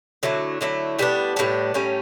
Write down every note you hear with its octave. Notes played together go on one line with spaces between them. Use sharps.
D3 F#3 A3 E4
D3 F#3 A3 E4
A2 G3 B3 D4
A2 G3 B3 D4
A2 G3 C#4